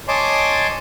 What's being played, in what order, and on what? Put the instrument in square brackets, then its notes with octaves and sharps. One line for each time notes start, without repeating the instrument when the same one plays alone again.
[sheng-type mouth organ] C#5 D#5 G#5 A5 C6 D6